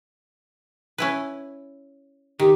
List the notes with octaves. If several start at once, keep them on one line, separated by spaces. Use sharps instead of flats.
C#4 E4 B4
D#3 G4